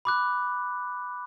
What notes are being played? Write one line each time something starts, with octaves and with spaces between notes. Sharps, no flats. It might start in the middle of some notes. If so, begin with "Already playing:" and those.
B5 D6 F#6